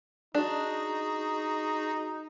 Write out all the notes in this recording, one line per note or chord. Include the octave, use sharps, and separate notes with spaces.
D4 D#4 F#4 G#4